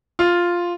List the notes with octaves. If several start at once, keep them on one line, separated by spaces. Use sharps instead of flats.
F4